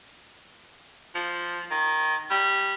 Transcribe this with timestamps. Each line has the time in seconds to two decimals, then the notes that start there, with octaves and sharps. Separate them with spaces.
1.15 F3
1.71 D#3
2.31 G3